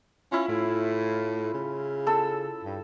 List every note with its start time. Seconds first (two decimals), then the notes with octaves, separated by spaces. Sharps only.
0.32 C#4 E4 F4
0.48 A2
1.54 C#3
2.07 A4 E6
2.64 G2